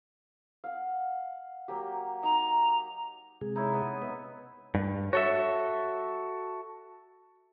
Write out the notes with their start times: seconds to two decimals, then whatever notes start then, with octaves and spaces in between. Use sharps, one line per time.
0.64 F5 F#5
1.68 F#3 A#3 G4
2.23 D#4 A#5
3.41 C3 G#3 G#4
3.55 D#4 E4 C#5
3.73 B3 D#5
4.02 B3 B4 E5
4.75 G2
5.13 F#4 A4 C#5 E5